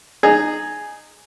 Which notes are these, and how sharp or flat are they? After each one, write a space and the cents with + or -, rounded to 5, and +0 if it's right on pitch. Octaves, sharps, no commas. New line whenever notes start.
D#4 -25 G#4 +0